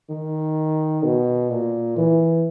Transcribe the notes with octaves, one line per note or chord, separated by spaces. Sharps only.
D#3
B2
A#2
E3